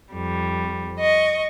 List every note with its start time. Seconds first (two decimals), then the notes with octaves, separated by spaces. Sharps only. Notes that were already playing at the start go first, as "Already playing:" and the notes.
0.12 F2 G3
1.00 D#5 C#6